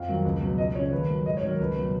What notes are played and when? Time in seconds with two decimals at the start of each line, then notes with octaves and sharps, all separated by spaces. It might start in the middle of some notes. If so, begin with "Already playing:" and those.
Already playing: F2 F5
0.08 D#3 F#3
0.24 C#2
0.42 B2 F#3
0.58 C#2 D#5
0.75 C#3 F3 C#5
0.92 D#2 B4
1.09 D#3 F#3
1.26 G#2 D#5
1.37 C#5
1.43 D#3 F#3 A#4
1.59 C#2 B4
1.76 B2 F#3